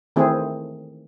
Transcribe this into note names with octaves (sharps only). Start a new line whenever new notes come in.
D#3 E3 A3 C4 E4 G#4